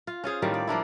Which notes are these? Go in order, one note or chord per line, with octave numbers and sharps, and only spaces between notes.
F4
C#4 F4 G#4 C5
A2 D#3 G3 A#3
D5
F3 A#3 D4 E4